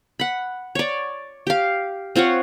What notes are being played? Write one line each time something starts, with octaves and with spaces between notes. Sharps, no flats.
F#5 B5
C#5 D5
G4 F5
C4 F4 C#5 F#5